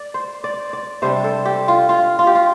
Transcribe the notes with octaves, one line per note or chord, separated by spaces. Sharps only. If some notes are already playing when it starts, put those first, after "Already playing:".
Already playing: D5
C5
D5
D5
C3 G3 D4 C5
A4
G4
F4
F4
F4
G4
F4